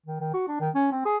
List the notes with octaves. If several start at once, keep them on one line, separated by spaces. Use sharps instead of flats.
D#3
D#3
F#4
D4
D#3
C#4
C4
G#4